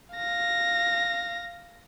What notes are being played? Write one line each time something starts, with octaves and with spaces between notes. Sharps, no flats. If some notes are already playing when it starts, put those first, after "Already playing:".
F5 A#6